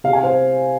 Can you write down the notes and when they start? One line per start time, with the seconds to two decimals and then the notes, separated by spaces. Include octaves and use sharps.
0.04 C3 F5
0.13 G#5
0.23 C5 F5